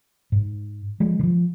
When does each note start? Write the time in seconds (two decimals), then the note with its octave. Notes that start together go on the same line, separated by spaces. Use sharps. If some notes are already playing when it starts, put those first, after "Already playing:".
0.32 G#2
1.00 F3 G#3
1.19 D3
1.23 F3